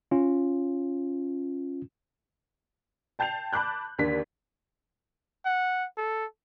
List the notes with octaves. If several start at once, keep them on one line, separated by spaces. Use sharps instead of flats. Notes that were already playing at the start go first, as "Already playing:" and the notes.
C#4 F4
G5 A5 G6 C7 F7
A5 B5 D6 F#6 G6
D#2 D3 D4 B6
F#5
A4